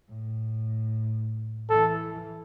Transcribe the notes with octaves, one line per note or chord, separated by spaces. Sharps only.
A2
E3 A4